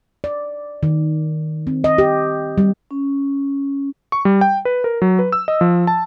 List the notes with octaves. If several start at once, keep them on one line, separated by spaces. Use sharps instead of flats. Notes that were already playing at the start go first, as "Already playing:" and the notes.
D5
D#3
C4
D#5
G4
G3
C#4
C#6
G3
G5
B4
A#4
F#3
B4
E6
D#5
F3
A5